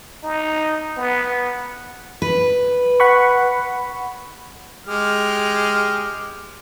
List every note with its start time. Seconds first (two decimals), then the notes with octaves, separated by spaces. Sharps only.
0.23 D#4
0.97 B3
2.22 B4
3.00 F#5 B5 C#6
4.87 G#3 G4 F6